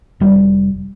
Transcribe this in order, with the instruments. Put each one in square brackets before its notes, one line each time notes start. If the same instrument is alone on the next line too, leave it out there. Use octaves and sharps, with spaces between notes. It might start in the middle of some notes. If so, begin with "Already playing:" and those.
[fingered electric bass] F1 G3